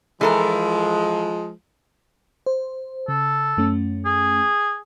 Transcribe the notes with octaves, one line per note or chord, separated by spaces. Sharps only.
E3 F3 G#3 A4 A#4
C5
C#3 A4
F#2 A3 C#4
G#4